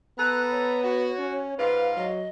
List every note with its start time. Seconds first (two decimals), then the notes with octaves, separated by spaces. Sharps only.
0.18 B3 A4 B4 A#5 F#6
0.50 C#5
0.83 F#4
1.19 C#4
1.58 G#2 F4 B4 F5
1.97 F#3 D#5